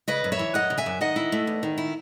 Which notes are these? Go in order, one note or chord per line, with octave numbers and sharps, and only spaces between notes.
C#3 B4 D#5
F#2
C#5 E5
E3
F#2 D#5 F#5
C#3
E5 G#5
F#2
D#3 D#5 F#5
E4
A3
E2
D#3
E4